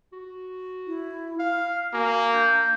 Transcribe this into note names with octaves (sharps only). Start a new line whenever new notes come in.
F#4
E4
F5 F6
A#3 F#4 G#5
D4 G6